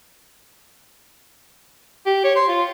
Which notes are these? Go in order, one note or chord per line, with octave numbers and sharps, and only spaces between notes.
G4
C#5
C6
F4